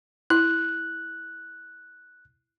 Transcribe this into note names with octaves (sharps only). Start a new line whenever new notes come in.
E4 F#6